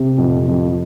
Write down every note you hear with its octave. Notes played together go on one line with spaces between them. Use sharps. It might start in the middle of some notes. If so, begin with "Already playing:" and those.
Already playing: C3
F2
F2